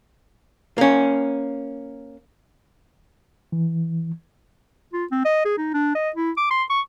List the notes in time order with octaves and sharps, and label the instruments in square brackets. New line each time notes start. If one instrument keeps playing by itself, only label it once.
[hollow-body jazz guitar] A#3 C#4
[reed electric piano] E3
[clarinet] F4
C4
D#5
G#4
D#4
D4
D#5
E4
D6
C6
C#6